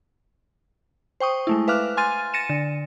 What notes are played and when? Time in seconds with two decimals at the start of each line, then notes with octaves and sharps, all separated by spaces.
1.20 C5 G5 C#6 D#6
1.47 G#3 A3 E4
1.68 B4 E5 F5 D6 F6 F#6
1.97 G#5 C6 F6 A6 D#7
2.34 A6 A#6 C#7 D#7 E7
2.49 D3